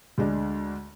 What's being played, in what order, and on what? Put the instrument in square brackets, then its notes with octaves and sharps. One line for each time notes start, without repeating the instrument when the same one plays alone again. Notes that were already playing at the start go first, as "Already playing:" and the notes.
[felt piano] D2 G#3 D4